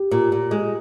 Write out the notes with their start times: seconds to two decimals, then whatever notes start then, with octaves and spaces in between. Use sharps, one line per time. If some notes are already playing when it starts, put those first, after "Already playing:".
Already playing: G4
0.11 A#2
0.32 A#2
0.51 G#3